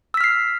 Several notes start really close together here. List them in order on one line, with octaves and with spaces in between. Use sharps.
E6 B6 F6 C7